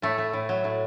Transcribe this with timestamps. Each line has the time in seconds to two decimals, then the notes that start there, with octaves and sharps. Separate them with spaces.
0.02 A2 A3
0.18 A3
0.33 A2
0.49 F#3
0.64 A2